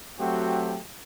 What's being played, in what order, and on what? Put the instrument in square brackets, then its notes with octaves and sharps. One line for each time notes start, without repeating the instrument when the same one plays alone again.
[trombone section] F#3 A3 C4 F#4 G4